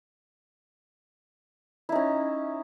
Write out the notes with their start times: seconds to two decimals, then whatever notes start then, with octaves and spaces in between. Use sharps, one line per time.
1.89 E4
1.92 D#4
1.95 C#4